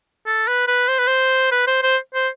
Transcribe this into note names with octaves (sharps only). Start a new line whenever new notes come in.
A4
B4
B4
C5
B4
C5
B4
C5
C5
C5